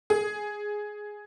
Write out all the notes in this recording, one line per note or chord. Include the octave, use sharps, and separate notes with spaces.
G#4